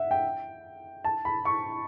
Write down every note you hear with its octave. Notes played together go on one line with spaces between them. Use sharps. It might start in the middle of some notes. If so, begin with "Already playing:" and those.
Already playing: E5 F#5
G5
A5
B5
C#6